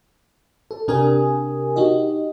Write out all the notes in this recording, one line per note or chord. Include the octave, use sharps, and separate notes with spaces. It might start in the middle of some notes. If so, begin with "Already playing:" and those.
A4
C3 D4 G4 A#4 G#5 D#6
D#4 F#4 G4 D#5